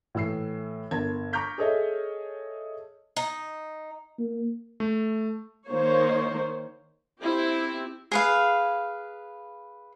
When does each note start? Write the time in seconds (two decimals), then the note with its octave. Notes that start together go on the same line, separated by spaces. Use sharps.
0.15 A2 E3 E6 C7
0.91 G1 A#4 A5 G#6
1.33 A#5 C#6 D6 F6 G6 B6
1.58 G#4 A4 C#5 D#5 E5
3.16 D#4
4.19 A#3
4.80 A3
5.68 D#3 A#3 C5 C#5
7.21 C4 E4 G4
8.11 G#4 B4 F5